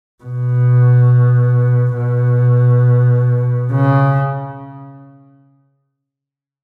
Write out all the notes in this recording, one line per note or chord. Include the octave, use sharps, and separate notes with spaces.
B2
B2
C#3